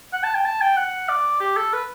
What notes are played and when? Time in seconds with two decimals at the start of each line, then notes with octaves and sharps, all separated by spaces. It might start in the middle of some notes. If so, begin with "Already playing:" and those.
0.13 F#5
0.23 A5
0.35 G5
0.45 A5
0.61 G5
0.77 F#5
1.09 D5
1.40 G4
1.57 A4
1.73 B4